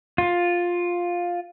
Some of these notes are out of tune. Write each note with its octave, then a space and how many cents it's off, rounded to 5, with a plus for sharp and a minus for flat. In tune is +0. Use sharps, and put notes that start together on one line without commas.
F4 +10